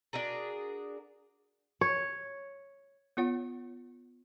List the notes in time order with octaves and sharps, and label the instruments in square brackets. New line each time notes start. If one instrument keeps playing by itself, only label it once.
[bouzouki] D4 F#4 G#4 A#4
[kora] C#5
[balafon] B3 F4 C#5 F#5